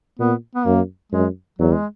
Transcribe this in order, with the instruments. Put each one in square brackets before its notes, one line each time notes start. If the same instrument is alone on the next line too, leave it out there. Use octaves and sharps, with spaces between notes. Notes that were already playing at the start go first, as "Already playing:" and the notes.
[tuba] A#2 [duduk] B3
[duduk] B3
[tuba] F#2 [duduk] A#3
[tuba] F#2 [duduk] G#3
[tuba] E2 [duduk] F#3
[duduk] G#3